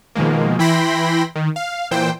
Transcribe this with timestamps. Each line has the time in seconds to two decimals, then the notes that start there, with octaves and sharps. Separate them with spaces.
0.15 B2 D#3 F3 G#3 A#3
0.59 E3 E4 G5 B5 C6 A#6
1.36 D#3
1.56 F5
1.91 A#2 E3 C5 G5